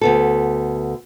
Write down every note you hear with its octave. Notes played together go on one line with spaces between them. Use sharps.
D2 B3 A4